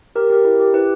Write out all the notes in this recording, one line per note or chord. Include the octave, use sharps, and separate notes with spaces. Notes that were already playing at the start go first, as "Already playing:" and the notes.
G4 A#4
G4 A#4
E4
G4
E4 B4